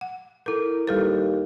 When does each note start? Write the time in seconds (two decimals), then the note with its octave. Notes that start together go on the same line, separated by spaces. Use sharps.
0.01 F#5
0.46 E4 A4 A#4
0.87 D#2 G3 A4 B4